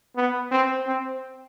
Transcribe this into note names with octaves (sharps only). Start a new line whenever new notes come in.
B3
C4
C4